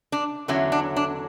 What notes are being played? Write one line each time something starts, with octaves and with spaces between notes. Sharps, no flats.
D4
E2 D3 F#3 C#4 E4
D4
D4